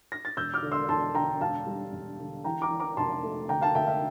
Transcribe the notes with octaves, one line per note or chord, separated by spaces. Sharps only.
A#6
A6
E1 E6 G6
D6 F6
D3
C6 E6
E1 A5 C6
D3 G5 A#5
E1 F5 A5
G3
E1
D3
E3 G5 A#5
A#5 D6
E3
A#5 D6
F1 A5 C6
A3
D2 G5 A#5
F5 A5
D2 E5 G5
E5